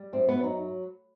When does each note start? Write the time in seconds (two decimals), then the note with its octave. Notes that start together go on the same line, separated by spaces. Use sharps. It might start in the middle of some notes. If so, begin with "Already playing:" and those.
Already playing: G3
0.13 F#2 C4
0.29 B3
0.36 F#3
0.44 D#4